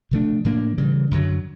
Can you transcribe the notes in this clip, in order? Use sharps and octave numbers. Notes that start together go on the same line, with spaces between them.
C3 F3 A3 D4
A2 F3 A#3 D4
C#3 E3 G3
F#2 D3 F#3